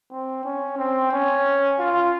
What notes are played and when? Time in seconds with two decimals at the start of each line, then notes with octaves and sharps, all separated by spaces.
0.11 C4
0.44 C#4
0.78 C4
1.12 C#4
1.79 F4